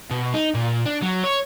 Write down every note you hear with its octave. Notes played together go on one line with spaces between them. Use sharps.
B2
D#4
A#2
D4
F#3
C#5